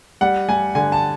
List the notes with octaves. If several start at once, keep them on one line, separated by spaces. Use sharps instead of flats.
G3 F#5
G3 G#5
D3 G#5
A5